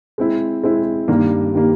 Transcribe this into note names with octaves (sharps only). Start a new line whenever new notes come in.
G#3 C4 E4
G#3 C4 E4
G2 D#3 G3 A#3
D#3 G3 A#3